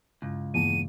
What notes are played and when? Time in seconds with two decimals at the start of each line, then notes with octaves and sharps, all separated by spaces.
0.22 C#2 G2
0.54 E2 G2 A#3 D#7